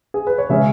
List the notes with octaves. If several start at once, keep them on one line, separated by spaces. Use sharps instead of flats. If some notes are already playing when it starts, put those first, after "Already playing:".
G#4
B4
C#5
C#3 G#3 C#4 E5